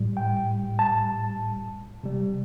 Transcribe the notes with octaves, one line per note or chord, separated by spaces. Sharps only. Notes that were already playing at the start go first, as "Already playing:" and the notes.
Already playing: A2 G3
G5
A5
C3 G3